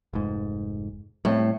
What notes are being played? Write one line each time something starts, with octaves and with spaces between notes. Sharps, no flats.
F1 G#2
A2 G3 G#3 C4